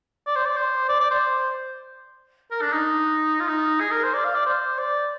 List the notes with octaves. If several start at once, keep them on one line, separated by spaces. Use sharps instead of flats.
D5
C5
D5
C5
D5
D5
C5
A#4
D4
D#4
F4
D#4
G#4
A#4
C5
D5
F5
D5
C5
D5